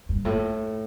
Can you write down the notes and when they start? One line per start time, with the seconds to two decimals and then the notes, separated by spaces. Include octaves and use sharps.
0.09 G2
0.25 A2